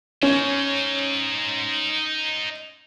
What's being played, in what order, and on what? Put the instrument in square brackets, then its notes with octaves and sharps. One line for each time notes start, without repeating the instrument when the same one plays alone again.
[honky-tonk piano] C#4 [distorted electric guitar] D#4 C5